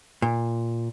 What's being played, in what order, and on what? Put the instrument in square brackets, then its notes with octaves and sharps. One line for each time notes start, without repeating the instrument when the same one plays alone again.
[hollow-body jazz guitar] A#2